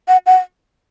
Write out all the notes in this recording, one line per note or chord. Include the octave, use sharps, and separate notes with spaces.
F#5
F#5